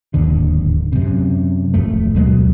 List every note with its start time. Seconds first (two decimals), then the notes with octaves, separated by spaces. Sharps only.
0.14 D1 G#1 D#2 D3
0.93 F#2 C3
1.74 D1 G#1 F2 A3
2.16 D2 B2 F#3 G#3